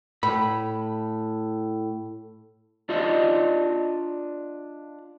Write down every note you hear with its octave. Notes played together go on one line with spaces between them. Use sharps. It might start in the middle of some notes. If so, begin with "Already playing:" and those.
A2 B5
D4 F4 D5 D#5